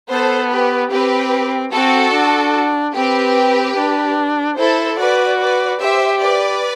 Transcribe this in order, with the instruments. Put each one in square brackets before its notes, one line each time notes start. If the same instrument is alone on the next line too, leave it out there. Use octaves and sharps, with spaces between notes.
[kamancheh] B3 [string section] A4 C5
[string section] G4 B4
[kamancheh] C4 [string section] G4 B4
[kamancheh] C4 [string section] F#4 A4
[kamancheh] D4
[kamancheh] C4 [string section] G4 B4
[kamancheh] D4
[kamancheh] E4 [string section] A4 C5
[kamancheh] F#4 [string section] B4 D5
[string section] B4 D5
[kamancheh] G4 [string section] C5 E5
[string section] B4 D5